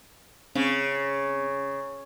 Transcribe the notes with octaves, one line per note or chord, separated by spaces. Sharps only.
C#3 C4 C#4